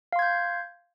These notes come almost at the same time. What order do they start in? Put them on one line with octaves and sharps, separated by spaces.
F5 C6 G#6 G6